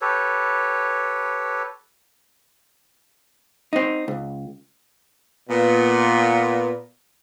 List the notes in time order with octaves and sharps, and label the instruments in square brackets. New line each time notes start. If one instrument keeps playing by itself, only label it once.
[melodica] G4 A4 B4 C#5
[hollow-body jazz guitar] C4 D#4
C#2
[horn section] A#2 B3